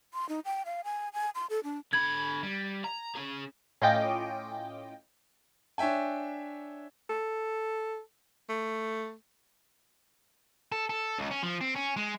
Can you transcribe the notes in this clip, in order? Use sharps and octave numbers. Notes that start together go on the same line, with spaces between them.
C6
D#4
G5
F5
G#5
G#5
C6
A4
D4
D3 B5 G#6
G3
A#5
C#4 G#4
A2 C#4 F4 D#5 G5 D6
D4 C#5 E5 G5 G#5
A4
A3
A4
A4
C#2
C#4
F3
C4
C#4
G#3